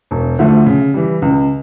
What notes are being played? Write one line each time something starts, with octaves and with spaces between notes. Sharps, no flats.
E1
D2 D3 F3 A3
C#3
E3 G3
C#2